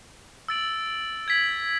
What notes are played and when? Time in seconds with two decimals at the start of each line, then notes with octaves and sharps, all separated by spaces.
0.48 E6 A6 D7 F#7
1.28 G#6 B6 F#7